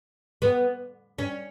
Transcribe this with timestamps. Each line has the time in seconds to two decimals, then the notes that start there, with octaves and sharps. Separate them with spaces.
0.42 B3
1.19 C#4